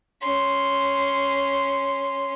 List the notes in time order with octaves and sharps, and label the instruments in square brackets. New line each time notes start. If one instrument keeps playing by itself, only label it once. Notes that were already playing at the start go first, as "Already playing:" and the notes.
[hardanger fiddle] C#4 C6